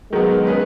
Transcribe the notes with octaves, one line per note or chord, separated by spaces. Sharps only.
D#3 F#3 G#3 B3
C#4 G#4 B4